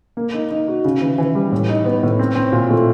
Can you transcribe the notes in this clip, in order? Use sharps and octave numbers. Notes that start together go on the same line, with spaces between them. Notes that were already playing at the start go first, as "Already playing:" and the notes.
A#3
D#4
D#4
F#4
C#3
E3
E3
G3
A2
D#4
B3
A2
C4
C4
A#2
A3